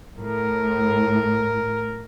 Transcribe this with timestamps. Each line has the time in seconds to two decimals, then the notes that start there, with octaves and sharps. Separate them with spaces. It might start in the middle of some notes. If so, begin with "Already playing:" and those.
0.18 A2 A#4